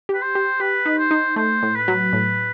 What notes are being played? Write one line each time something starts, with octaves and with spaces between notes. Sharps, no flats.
G4 B4
C5
G4
G4 B4
D#4
C5
D#4
A3 C5
A2
B4
F#3
A2